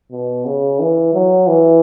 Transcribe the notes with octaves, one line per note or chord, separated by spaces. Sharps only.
B2
C#3
E3
F#3
E3